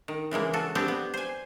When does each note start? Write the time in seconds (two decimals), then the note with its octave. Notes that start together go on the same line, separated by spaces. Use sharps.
0.08 D#3
0.31 C#3 E3 G#3 A#3
0.53 F#4 A4
0.75 B3 C4 D4 G4
0.88 B3
1.14 C5 G#5